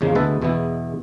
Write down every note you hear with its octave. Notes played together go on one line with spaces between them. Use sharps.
E2 G#2 C#3 F3 G#3 A#3
D2 G#3 B3 B4 E5 A5
E2 B2 E3 G#3 B3 E4